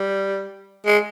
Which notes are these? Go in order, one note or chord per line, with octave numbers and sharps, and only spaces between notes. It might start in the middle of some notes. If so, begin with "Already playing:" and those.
Already playing: G3
G#3